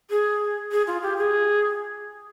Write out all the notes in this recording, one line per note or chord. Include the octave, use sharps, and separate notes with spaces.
G#4
G#4
F4
G4
G#4